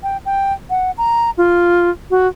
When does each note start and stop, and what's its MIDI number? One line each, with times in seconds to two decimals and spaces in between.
0.03 0.17 79
0.26 0.53 79
0.70 0.91 78
0.98 1.30 82
1.38 1.90 65
2.10 2.27 66